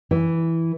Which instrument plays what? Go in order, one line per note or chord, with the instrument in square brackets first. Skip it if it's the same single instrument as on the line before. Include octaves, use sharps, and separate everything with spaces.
[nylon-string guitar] E3